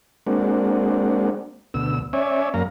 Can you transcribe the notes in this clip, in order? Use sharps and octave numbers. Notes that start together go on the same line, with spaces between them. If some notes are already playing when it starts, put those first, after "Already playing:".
G#3 A#3 C4 D4 F#4
D2 B2 E6
C#4 C#5 D5 E5 G#5
F#2 A#3 F5 A#5